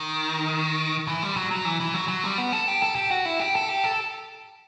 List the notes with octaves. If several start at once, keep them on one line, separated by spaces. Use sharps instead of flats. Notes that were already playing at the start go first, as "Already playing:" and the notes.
Already playing: D#3
E3
G3
F#3
F#3
E3
E3
F#3
F#3
G3
B3
A4
G4
A4
G4
F#4
E4
G4
A4
G4
A4